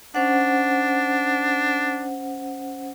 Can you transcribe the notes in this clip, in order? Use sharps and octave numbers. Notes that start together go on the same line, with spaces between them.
C#4 D4 C5 F#5